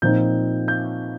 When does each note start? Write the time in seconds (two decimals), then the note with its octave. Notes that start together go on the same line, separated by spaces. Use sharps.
0.02 A#2 F3 C4 D#4 G6
0.68 G6